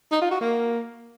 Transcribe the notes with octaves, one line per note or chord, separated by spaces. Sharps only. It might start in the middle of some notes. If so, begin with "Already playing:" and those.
D#4
F4
F#4
A#3